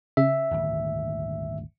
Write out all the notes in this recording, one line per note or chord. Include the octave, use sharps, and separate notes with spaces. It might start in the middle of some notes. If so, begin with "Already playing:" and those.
C#3 E5
D#1 G#1 D2